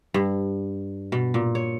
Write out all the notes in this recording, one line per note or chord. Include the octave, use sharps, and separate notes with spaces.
G2
B2
A#2
C#5